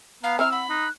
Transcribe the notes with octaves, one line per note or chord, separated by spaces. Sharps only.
B3 F5 A#5
C4 E4 E5 E6 F6
F#5 B5
D#4 F#6